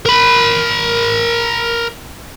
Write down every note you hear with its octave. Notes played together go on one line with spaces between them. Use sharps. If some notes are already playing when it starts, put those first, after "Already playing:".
A#4 B5